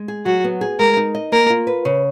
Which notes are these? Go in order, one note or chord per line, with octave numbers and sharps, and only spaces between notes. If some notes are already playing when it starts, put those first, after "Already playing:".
Already playing: G#3
G#4
F#3 F#4
B3
G#4
G#3 A#4
D#4
D#5
A#3 A#4
F4
B4
C#3